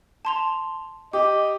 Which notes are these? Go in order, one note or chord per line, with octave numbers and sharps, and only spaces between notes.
A5 C6 F7
G4 D#5 D6